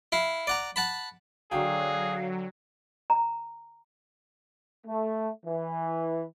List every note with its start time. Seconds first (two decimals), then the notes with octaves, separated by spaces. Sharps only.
0.12 E4 F5
0.47 D5 F#5 A#5
0.76 F#5 A5 B5
1.51 D3 F#3 D4 G#4 F5 G5
3.10 A#5
4.87 A3
5.46 E3